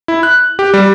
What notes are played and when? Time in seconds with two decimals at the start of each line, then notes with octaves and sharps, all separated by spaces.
0.08 E4
0.23 F#6
0.59 G4
0.74 G3